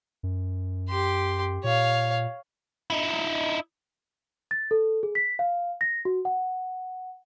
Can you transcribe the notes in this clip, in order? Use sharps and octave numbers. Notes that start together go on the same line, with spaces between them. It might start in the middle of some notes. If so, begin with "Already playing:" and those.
F#2
G4 C6
A#2 C#5 F5
D#4 E4
A6
A4
G#4
B6
F5
A#6
F#4
F#5